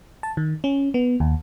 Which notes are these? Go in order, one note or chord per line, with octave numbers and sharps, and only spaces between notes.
A5
D#3
C#4
B3
D#2